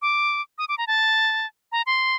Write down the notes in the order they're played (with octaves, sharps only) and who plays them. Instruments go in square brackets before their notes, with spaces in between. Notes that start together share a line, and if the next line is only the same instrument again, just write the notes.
[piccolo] D6
D#6
D6
A#5
A5
A#5
C6